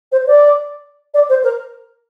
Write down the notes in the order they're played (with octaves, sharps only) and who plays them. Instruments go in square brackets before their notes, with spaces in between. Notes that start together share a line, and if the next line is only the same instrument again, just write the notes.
[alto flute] C5
D5
D5
C5
A#4